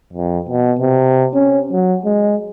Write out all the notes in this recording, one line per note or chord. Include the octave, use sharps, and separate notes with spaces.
F2
B2
C3
C#4
F#3
G#3